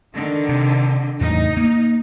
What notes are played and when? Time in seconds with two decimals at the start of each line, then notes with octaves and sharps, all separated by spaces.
0.15 D3 D#3
0.49 C3
1.21 E2 A2 C#3 D#4
1.57 A#3